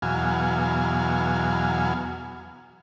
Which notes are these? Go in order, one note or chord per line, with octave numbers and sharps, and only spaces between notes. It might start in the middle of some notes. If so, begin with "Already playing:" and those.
E2 B2 F#3 F5 G#5